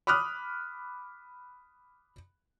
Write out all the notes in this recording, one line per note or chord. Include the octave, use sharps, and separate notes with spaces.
B5 D6 D#6 F6 F#6